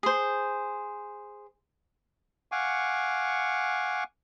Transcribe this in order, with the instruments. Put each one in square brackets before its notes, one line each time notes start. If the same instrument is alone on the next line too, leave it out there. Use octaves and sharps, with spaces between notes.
[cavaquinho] G#4 C5
[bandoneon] F5 F#5 G#5 C#6 D6